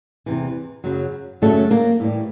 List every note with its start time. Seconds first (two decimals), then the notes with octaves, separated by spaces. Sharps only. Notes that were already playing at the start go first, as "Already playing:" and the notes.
0.26 E2 C3 E3
0.84 F#2 C#3 F#3
1.42 F#2 C#3 F#3 A3 A4
1.70 A#3 A#4
2.00 A2 E3 G3